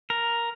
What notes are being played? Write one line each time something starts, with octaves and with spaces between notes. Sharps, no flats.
A#4